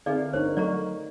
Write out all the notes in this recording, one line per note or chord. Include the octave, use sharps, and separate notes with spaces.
D3 C4 D#4 G#4 D5 E5 F5
G1 D4 D#4 A#4 C5 C#5
F#3 A3 A4 D5 D#5 A#5 C#6